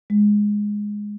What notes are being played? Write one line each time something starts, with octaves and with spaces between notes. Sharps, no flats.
G#3